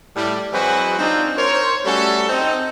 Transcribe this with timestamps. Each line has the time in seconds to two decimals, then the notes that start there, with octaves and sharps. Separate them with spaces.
0.16 A2 G3
0.53 E3 F#3 G#3 C4 F#4 B4
0.99 C4 D4 D#4 F4
1.37 A#4 C5 C#5
1.85 G3 A3 C#4 F#4 A4
2.29 C4 D#4